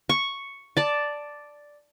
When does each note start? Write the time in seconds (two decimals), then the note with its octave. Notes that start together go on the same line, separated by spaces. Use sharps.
0.09 C#6
0.77 D5 A5